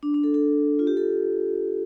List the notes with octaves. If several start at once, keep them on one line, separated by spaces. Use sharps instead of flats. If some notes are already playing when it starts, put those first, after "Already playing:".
D4
D4
A4
A4
F4
G4
A4